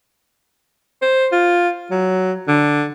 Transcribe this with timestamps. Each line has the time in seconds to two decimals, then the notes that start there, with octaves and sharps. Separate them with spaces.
1.02 C5
1.32 F4
1.91 F#3
2.48 D3